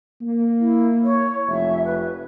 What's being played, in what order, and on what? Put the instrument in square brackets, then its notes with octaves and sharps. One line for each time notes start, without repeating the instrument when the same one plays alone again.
[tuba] A#3
[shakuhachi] E4
C#5
[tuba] F1 [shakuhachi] E5
[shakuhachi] B4